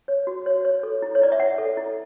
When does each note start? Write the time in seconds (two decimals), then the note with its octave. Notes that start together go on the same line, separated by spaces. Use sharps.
0.08 C#5
0.27 F#4
0.46 C#5
0.65 C#5
0.83 A4
1.02 E4
1.15 C#5
1.21 E4 D5
1.32 E5
1.40 C#5 F#5
1.58 A4
1.77 E4